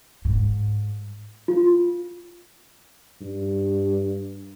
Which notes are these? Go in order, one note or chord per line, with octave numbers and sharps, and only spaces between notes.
G#2
F4
G2